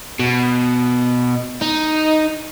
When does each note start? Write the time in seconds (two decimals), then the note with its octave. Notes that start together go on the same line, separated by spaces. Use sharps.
0.19 B2
1.62 D#4